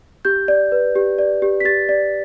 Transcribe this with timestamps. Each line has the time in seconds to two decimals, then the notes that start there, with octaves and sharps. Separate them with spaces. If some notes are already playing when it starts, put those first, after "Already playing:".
0.25 G4 G6
0.48 D5
0.72 B4
0.96 G4
1.19 D5
1.42 G4
1.60 B6
1.65 G4 A6
1.89 D5